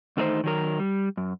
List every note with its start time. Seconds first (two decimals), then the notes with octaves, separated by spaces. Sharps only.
0.17 E2 D#3 A3 D4 D#4 C5
0.44 D#3 F#3 A#4
0.80 G3
1.17 F#2